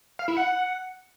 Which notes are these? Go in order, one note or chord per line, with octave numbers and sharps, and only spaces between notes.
F5
E4
F#5